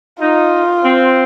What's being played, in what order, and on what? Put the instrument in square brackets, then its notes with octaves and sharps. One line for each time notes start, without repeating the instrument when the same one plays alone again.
[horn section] D#4 [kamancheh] F4
[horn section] C4